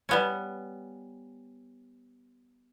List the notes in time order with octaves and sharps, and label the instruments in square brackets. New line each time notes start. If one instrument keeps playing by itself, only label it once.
[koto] G3 B3 C#4